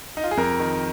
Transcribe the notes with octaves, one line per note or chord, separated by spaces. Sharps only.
D#4
F4
G#4
F2 A#4
D#3